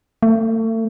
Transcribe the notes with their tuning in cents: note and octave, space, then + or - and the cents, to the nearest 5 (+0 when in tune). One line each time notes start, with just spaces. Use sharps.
A3 +35